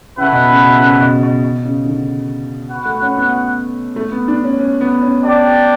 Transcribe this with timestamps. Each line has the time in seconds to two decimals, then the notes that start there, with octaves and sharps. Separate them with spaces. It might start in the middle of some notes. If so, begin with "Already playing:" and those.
0.17 C#3 A3 E4 B4 F#5
0.32 B2
0.48 C#3
0.64 B2
0.80 C#3
1.01 B2
1.23 B2
1.44 B2
1.64 C#3
1.86 D3
2.70 F#4 B4 F#5
2.85 A3
3.02 C#4
3.17 B3
3.96 A3
4.12 B3
4.28 D4
4.44 C#4
4.59 C#4
4.81 B3
5.01 C#4
5.22 D4 G4 D5 G5